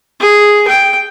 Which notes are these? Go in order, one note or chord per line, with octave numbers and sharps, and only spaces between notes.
G#4
G5